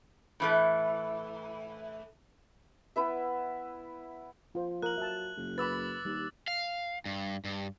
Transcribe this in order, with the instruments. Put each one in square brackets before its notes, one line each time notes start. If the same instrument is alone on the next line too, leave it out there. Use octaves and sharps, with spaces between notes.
[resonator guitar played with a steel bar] A2 E3 A3
[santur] B3 E4 B4 E5
[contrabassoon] F3 [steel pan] F4 C5
[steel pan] F4 A#4 [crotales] F#6 F#7
[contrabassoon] F#3 [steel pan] E5 A5
[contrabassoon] F#1
[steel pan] B4 F#5 B5 [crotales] D6 E6 A6
[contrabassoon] D#2 [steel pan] G3
[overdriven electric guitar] F5
G2
G2